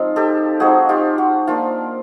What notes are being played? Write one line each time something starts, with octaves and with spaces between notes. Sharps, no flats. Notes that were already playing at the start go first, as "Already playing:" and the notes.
Already playing: F3 G#3 C4 D#4 F4
G4 A4
F3 G#3 C4 D#4 F#4 G#4
F4 G4
F#4
F3 A#3 D4 F4